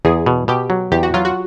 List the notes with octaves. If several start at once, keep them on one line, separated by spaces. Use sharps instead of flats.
E2 G#4
B2
B2 G4
F#3
E2 G4
F#4
F#3 F4
F#4